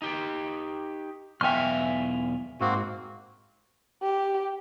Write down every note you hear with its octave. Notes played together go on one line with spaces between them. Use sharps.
D#4 G4
B1 E2 E5 F5 G5 G#5 C#6 F6
G#2 A#3 C4 F#4
G4